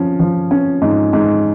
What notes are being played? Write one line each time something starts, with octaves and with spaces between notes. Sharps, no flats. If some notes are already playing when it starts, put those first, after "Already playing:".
Already playing: F3 C#4
F3
C#4
G#2
G#2